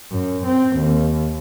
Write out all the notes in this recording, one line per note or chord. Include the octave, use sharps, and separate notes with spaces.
F#2
C4
D#2